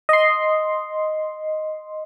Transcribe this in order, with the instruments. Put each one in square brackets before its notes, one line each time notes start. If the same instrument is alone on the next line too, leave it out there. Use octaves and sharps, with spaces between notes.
[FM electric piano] D#5 C6